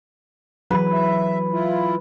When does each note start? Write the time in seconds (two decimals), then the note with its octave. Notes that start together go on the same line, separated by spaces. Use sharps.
0.71 E3 F#3 B4
0.93 E5
1.51 E4 F4